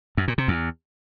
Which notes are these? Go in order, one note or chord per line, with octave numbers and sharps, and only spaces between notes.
F#2
A#2
C3
E2